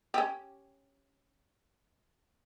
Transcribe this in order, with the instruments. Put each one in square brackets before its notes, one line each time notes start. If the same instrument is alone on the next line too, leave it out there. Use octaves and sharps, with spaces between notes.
[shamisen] C#4 G4